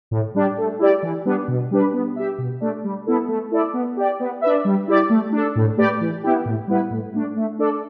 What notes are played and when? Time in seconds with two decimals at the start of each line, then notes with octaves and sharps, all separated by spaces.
0.11 A2
0.35 G3 D4 G4
0.58 A3
0.79 E4 G4 D5
1.03 E3
1.25 G3 B3 D4
1.48 B2
1.71 G3 D4 B4
1.93 B3
2.16 G4 E5
2.38 B2
2.61 A3 D4
2.84 G3
3.07 B3 E4 A4
3.28 A3
3.51 E4 A4 D5
3.73 B3
3.97 G4 D5
4.20 B3
4.41 D4 B4 E5
4.65 G3
4.88 E4 G4 D5
5.10 A3
5.32 D4 A4
5.56 A2
5.77 A3 G4 B4 D5
6.00 E3
6.23 B3 E4 G4
6.45 A2
6.68 G3 B3 E4 B4
6.90 A2
7.14 A3 D4
7.36 A3
7.59 D4 A4 D5